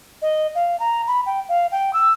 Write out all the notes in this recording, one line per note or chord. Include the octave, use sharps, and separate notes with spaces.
D#5
F5
A#5
B5
G5
F5
G5
E6